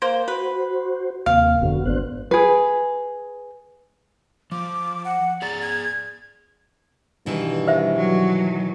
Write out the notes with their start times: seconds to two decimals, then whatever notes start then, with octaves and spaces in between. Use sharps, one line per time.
0.02 A#3 C5
0.28 F#4 B4 C5
1.26 D#2 C3 A#3 F5
1.61 F1 A#2 D3 B3 F#4
1.85 G#1 B3 D4 C5 F#6
2.31 G#4 B4
4.52 F3 D6
5.05 F#5
5.42 G#4 D5 A#5 A6
5.62 G#6
7.26 G2 B2 D#3 E3
7.68 C5 E5
7.97 F#3